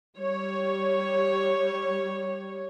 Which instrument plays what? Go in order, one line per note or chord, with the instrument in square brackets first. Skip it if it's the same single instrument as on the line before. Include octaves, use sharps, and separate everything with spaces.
[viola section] G3 C#5